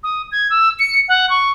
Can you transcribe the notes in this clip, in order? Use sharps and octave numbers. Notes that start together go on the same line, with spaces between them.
D#6
G#6
E6
C#7
F#5
C#6